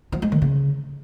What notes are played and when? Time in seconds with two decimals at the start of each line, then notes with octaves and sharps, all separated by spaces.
0.12 F3
0.22 G#3
0.32 D#3
0.42 C#3